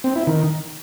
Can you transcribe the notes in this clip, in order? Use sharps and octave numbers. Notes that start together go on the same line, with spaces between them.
C4
E4
D#3